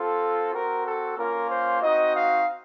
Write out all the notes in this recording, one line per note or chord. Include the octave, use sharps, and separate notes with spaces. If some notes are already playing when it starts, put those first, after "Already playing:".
Already playing: C4 F4 A4
C4 F#4 A#4
A4
A#3 C#4 F4 A#4
C5
C4 D#4 F#4 D#5
F5